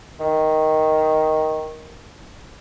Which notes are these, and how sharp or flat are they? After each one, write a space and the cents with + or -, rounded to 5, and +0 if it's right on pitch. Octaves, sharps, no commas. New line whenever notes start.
D#3 +5